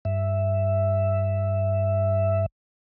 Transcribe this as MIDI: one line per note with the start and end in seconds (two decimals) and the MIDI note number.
0.05 2.46 43
0.05 2.46 76